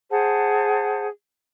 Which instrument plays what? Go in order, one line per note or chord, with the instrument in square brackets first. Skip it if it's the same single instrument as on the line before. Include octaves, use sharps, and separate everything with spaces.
[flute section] G#4 C5 F#5 A5